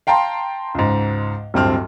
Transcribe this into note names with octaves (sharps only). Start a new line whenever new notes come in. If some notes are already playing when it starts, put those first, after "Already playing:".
F5 G5 A5 A#5 C6
C#2 G#2
D1 G2 C4 F6